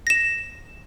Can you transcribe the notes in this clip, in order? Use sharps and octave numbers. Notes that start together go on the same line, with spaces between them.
A#6 E7